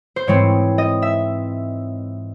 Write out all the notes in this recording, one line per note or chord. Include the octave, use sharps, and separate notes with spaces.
C5
G#2 E3 G#3 C4 C#5
D#5
E5